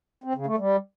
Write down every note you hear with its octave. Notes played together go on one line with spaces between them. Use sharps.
C4
C#3
A3
G3